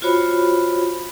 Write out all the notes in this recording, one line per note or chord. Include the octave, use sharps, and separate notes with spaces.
F4 F#4 C5 C#5 B5